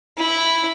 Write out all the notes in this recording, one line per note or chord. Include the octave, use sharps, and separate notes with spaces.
E4